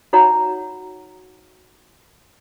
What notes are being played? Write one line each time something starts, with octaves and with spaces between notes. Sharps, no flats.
D#4 F#4 C#5 F#5 A#5